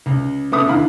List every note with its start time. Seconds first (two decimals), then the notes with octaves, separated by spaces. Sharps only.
0.06 C#2
0.52 C#3 B3 A4 E5 D6 D#6
0.67 D#2 D3 E4 F5 B5